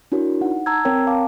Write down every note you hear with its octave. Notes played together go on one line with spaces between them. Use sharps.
D4 E4 F#4 A#4 C#5
D#4 F#5
A5 A#5 E6 G#6
C4 A#4 C#5 G5 A#5
F5 A5 D6